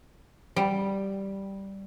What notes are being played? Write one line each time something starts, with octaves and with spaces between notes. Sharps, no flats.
G3